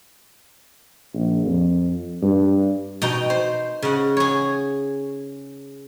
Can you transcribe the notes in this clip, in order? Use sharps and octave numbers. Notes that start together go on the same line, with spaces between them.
A#1
F2
G2
B2 D#4 G5
C5
C#3 F#5
G#4 C#5